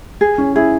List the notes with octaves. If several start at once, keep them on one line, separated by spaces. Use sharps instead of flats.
G#4
C#4
E4 G#4